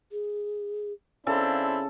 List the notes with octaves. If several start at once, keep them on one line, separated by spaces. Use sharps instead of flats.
G#4
C#3 C4 D4 E4 A4 F5